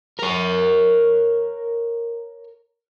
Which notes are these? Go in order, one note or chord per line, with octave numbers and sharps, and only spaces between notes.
A#4 C#5